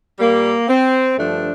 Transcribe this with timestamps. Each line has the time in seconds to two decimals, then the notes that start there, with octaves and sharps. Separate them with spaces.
0.20 A#2 G3 A#3
0.68 C4
1.18 G2 D3 F3 A3 D4